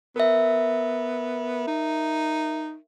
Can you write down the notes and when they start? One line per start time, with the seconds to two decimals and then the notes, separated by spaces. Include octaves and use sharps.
0.16 B3 A#4 E5
1.67 D#4